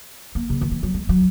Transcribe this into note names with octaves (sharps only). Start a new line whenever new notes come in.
A#3
C#3
D#3
E3
F#3
G#3
F#3